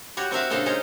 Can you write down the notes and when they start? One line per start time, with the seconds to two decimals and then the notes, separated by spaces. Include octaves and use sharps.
0.17 G3 F#4 G4 C#5
0.31 C4 F#4 A#4 E5 F5
0.50 A#2 C#3 D4 A4 C5 F5
0.66 G#3 C#4 D#4 C5 C#5